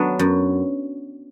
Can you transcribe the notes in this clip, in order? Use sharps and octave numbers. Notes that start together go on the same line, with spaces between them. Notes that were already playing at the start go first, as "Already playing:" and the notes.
Already playing: F#3 B3 D4
F#2